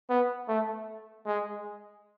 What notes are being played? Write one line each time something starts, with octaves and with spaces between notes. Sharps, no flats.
B3
A3
G#3